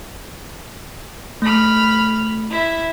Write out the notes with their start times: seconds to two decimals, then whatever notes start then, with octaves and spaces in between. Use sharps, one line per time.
1.42 A3 B5 F6
2.50 E4 E5